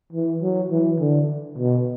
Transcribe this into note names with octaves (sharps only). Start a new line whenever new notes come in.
E3
F#3
E3
D3
B2